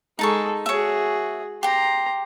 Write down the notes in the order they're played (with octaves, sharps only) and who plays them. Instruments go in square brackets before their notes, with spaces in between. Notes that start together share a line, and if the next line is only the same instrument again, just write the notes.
[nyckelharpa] G#3 A4 [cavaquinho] D#4 A5 C#6
[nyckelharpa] F#4 G#4 [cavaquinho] C#5 E5
[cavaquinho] G4 G5 [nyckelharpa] A#5 C6